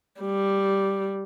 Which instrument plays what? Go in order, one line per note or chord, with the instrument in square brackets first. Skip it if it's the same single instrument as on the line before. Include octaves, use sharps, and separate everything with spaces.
[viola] G3